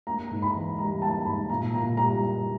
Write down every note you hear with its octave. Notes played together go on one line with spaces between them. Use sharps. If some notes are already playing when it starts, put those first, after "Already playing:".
A#3 A#5
G#2
B5
E3
G3 A#5
A#3 A5
G#2 B5
A#2 A#5
A#2 A#5
G3 A#5